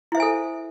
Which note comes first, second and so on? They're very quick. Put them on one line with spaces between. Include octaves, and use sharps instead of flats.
E4 E5 C5 G#5 A4